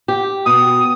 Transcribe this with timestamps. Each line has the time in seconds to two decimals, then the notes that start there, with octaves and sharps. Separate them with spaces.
0.08 G4
0.46 B2 D#6